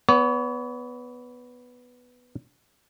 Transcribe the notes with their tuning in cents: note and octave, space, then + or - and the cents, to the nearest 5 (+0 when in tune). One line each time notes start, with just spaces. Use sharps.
B3 +0 C#5 +40